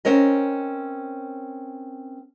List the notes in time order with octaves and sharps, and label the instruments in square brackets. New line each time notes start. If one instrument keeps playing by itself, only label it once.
[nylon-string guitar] C4 C#4 A#4 D#5